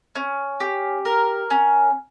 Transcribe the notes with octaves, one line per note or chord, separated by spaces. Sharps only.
C#4
G4
A#4
C#4